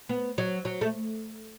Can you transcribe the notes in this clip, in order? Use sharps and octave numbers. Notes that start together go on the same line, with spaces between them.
B3
F#3
F#3
A3